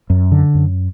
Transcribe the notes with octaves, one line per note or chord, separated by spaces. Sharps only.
F#2
D3
F#2